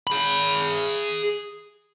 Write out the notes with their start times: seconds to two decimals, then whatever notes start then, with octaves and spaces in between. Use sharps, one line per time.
0.07 G#4 B5